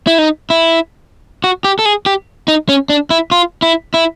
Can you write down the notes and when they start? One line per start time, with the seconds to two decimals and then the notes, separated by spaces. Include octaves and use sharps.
0.07 E4
0.18 D#4
0.50 E4
1.44 F#4
1.64 G4
1.79 A4
1.86 G#4
2.06 G4
2.48 D#4
2.69 C#4
2.90 D4
3.10 E4
3.31 F4
3.62 E4
3.94 E4